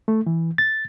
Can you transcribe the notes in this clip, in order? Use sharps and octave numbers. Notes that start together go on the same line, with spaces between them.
A3
E3
A6